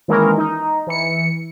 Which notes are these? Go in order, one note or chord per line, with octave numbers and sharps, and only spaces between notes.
D#3 E3 G#3 A#3 C#4 A#4
D#4
E3 C#7